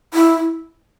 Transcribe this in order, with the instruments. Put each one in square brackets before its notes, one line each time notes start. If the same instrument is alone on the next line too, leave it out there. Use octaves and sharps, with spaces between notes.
[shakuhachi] E4